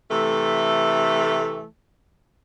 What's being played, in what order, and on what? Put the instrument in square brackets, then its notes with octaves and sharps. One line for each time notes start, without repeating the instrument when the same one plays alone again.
[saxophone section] C3 E3 A3